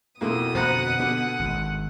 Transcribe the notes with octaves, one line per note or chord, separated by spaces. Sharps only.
F2 B2 A#3 E4 D#6
F2 D3 C5 F#5 A#5 B5
D3 B3
G#1